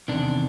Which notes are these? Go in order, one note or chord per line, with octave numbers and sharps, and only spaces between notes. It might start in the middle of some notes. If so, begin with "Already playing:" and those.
E2 C3 D#3 D4